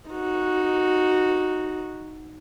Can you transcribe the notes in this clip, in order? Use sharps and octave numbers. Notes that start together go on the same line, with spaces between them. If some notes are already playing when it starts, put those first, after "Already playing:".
D#4 F#4